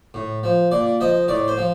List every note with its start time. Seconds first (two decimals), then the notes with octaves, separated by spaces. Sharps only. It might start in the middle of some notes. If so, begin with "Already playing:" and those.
0.14 A2
0.43 F3
0.71 A#2 D5
1.00 F3 D#5
1.28 A2 D5
1.48 C5
1.57 F3